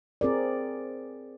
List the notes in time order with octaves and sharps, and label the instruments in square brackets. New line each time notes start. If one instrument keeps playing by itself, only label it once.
[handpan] C4 G#4 A#4 D5